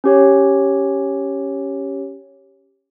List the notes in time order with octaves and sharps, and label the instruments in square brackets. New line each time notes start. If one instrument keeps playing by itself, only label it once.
[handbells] C#4 G4 C#5